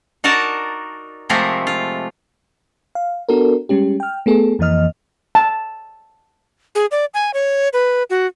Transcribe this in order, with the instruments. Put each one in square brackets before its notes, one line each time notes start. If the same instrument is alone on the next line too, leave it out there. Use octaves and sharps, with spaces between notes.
[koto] D#4 F#4 A#4 D5 A5
C3 F3 G#3 A3 C4 A#4
F4
[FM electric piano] F5
B3 D4 F#4 A4 A#4
G3 G#3 C#4 G4
G5 F6
A3 B3 G#4 A4
F2 E3 A#3 D#5 F6
[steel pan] A5
[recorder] G#4
D5
G#5
C#5
B4
F#4